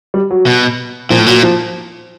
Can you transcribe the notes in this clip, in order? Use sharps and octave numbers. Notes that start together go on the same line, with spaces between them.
G3
F#3
B2
A#2 F3
A2
A#2 F#3
F3